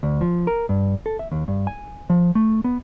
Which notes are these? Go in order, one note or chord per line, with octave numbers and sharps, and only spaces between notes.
D2
F3
A#4
G2
A4
E5
D#2
G2
G#5
F3
A3
B3